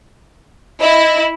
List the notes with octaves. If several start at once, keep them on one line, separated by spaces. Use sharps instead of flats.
E4 D#5